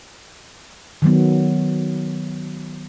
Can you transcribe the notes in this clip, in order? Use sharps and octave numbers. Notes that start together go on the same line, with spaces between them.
D#3 F#3 B3